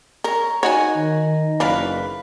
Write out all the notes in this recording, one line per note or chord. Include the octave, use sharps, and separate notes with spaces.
A#4 C#5 A#5
D#4 F#4 C#5 D#5 F#5 G#5
D#3
F#1 E3 F#3 D4 B4 F5 B5